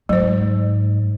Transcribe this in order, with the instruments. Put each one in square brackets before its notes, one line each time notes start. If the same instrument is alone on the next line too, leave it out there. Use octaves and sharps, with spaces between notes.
[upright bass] G#2 [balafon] F#3 C5